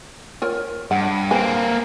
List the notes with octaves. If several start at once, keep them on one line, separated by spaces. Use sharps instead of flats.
F4 A#4 C#5
G2 F#5
A#3 C4 B4 G#5